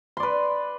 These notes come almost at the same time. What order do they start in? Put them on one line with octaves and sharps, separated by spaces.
C6 D5 B4